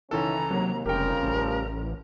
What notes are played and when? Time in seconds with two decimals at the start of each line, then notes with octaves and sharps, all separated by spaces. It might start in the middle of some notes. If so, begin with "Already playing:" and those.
0.11 C#2 D#3 E3 C#4 E4 A4 A#5
0.50 D#2 C3 F#3 A#3
0.86 F1 C#3 F3 G3 G4 A#4 G5 A#5
1.22 A1